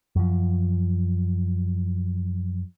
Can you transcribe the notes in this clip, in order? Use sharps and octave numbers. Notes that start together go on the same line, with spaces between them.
F#2 F3